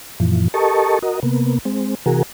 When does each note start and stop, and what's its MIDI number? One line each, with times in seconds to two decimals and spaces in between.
0.20 0.48 42
0.20 0.48 46
0.20 0.48 52
0.20 0.48 53
0.54 0.99 67
0.54 0.99 69
0.54 0.99 70
0.54 0.99 75
0.54 0.99 81
0.54 0.99 85
1.02 1.20 66
1.02 1.20 70
1.02 1.20 75
1.23 1.58 48
1.23 1.58 58
1.23 1.58 59
1.65 1.95 56
1.65 1.95 60
2.06 2.23 48
2.06 2.23 52
2.06 2.23 66
2.06 2.23 68
2.06 2.23 70